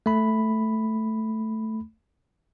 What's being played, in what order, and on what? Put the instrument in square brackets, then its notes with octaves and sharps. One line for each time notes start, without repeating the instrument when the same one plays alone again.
[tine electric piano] A3 B5